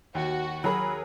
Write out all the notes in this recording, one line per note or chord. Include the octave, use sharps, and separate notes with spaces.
D#2 F#4
F#3 G#4 A#4 B5